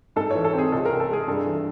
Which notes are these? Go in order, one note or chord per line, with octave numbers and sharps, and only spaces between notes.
G#2 A4
E3 C#5
A4
C4 G#4
C#2 A4
A#4
C3
A4
G#3 G#4
G2 A4
E3